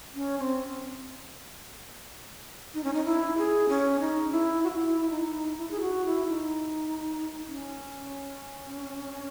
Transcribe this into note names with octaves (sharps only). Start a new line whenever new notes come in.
C#4
C#4
C4
D#4
C#4
D#4
E4
G#4
C#4
D#4
E4
F#4
E4
E4
D#4
E4
G#4
F#4
E4
D#4
C#4